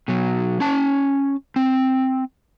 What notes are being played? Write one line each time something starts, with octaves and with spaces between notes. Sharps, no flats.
B2 F#3
C#4 A5
C4